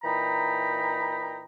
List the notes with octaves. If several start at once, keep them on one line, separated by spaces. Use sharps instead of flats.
A#2 E3 D#4 G5 A#5 B5